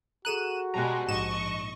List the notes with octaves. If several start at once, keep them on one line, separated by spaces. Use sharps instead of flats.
F#4 G#4 A4 A#5 F#6 D#7 E7
B2 G3 G#3 A5 A#5 F#6
A#1 G#2 D#5 C#6 E7